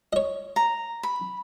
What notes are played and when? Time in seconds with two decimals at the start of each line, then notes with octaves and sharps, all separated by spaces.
0.13 C#5 D#5
0.56 A#5
1.03 B5